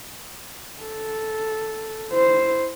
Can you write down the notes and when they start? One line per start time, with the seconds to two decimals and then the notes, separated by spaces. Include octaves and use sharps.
0.82 A4
2.12 E4 C5